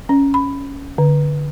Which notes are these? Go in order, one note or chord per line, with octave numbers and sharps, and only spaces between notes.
C#4
B5
D3